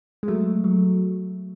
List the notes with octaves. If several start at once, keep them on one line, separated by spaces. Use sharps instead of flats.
G#3
F#3 A3
F#3